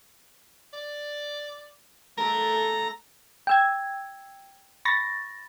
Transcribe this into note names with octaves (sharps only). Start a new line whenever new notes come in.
D5
A3 A4 A#4 A#5
G5 E6 G#6
B5 C#6 A6 A#6